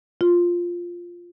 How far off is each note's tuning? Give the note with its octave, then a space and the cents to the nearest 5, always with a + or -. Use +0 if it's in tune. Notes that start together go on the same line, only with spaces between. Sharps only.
F4 +0